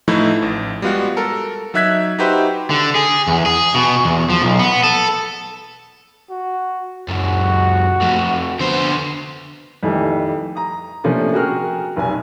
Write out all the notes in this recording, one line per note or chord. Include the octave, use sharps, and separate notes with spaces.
A2 E3 F3 A3 D#4 E4
A1
G3 G#3 B3 F4 F#4
A4 A#4
F#3 D#4 E5 F#6 G#6 B6
D#4 F#4 G4 B4 C5 E5
D3
G#4
E2
G#4
B2
E2
F3
B1
B3
A4
F#4
C#2 F#2 F#4
F2 A3
D3 B3 C5
F2 D#3 E3 G3 A3
A#5 D#6
C3 F3 A3 A#3 C#4 D4
F#4 G#4 A#4 G5 F6
F1 B1 G#5